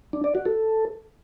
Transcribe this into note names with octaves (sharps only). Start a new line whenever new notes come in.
D4
D5
F#4
A4